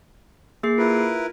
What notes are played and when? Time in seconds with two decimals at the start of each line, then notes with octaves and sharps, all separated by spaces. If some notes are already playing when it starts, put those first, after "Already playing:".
0.63 A#3 G#4 C7
0.78 E4 F4 A#4 B4